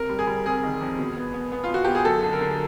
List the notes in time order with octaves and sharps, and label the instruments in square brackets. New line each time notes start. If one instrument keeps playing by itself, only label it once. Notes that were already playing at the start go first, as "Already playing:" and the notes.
Already playing: [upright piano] C3 A#4
G3
G#4
G3
C3 G#4
D#3
F2
B2
B3
B3
B3
F4
B2 F#4
B2 G4
G#4
F#2 A4
D3
A#4
D3